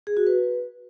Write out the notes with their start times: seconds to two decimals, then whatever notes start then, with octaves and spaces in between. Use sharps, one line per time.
0.07 G#4
0.17 F#4
0.27 B4